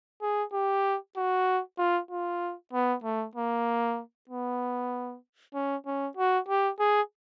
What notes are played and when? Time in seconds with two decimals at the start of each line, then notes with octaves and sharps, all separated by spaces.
0.22 G#4
0.53 G4
1.17 F#4
1.78 F4
2.11 F4
2.73 B3
3.04 A3
3.36 A#3
4.30 B3
5.55 C#4
5.86 C#4
6.17 F#4
6.49 G4
6.80 G#4